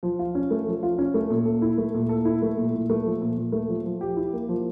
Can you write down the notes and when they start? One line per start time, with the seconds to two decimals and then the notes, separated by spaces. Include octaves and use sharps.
0.03 F3
0.19 F4
0.35 C#4
0.51 A3
0.67 F3
0.83 F4
0.98 C#4
1.14 A3
1.30 A#2
1.46 A4
1.62 E4
1.78 A3
1.94 A#2
2.09 A4
2.25 E4
2.42 A3
2.57 A#2
2.74 A#2
2.90 A3
3.05 F3
3.22 A#2
3.37 A#2
3.52 A3
3.68 F3
3.85 F3
4.01 G4
4.16 E4
4.33 A#3
4.49 F3